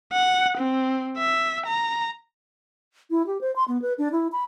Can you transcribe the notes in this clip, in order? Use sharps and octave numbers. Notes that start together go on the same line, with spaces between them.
F#5
C4
E5
A#5
E4
G4
C5
C6
B3
B4
D4
E4
B5